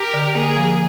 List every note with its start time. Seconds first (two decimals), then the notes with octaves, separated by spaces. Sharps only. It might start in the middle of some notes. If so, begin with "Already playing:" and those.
Already playing: G4 A#4
0.14 D3
0.35 A#3 G#4
0.56 F3